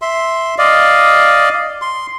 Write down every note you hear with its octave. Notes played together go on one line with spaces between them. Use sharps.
E5 C6
D5 D#5 F5
C6